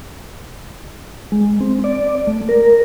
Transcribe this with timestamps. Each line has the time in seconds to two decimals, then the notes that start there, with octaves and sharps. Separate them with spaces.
1.32 G#3
1.60 C4
1.84 D5
2.27 A3
2.49 A#4